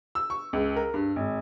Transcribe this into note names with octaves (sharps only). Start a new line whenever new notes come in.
E6
C#6
C#2
A#4
G2
G#1